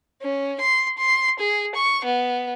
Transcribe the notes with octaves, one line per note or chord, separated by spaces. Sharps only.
C#4
C6
C6
G#4
C#6
B3